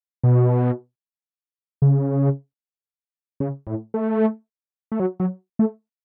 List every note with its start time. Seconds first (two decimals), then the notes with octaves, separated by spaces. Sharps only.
0.24 B2
1.82 C#3
3.40 C#3
3.67 A2
3.94 A3
4.92 A3
5.00 F#3
5.20 F#3
5.59 A3